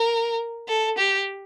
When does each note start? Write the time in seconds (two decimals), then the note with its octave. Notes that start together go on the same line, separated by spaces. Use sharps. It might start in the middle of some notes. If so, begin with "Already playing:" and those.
Already playing: A#4
0.69 A4
0.98 G4